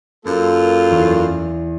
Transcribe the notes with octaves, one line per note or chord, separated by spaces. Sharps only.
F#2 A#3 F4 A4
E2